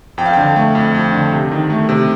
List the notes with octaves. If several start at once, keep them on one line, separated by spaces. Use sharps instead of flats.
F2 G5
F5
D3 G5
A3
F2
F2
D3
C3
D#3
A3
C3